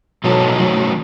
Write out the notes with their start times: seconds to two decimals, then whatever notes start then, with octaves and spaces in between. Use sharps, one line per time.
0.24 B2 F#3 G#3 D#4 A4
0.58 D#3 F#3 A3 C#4 F#4